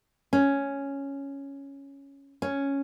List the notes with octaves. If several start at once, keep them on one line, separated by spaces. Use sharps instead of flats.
C#4
C#4